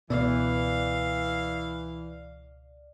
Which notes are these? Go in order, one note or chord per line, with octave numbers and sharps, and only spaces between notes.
C#2 B2 E3 D5 F5